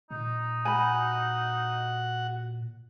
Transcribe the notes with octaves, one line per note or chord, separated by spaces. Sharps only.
A#2 D#4
F#4 F#5 G#5 B5